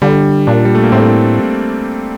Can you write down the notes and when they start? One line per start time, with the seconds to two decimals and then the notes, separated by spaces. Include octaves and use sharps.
0.02 D3 G3
0.47 A#2 D4
0.65 G3
0.75 A3
0.83 A#3
0.92 A2 C4